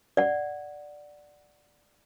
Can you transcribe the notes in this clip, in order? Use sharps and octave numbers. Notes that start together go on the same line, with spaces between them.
D5 F#5